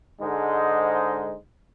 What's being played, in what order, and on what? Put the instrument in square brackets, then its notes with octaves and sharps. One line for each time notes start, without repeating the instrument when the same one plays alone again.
[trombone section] G#2 D3 G#3 D#4 C5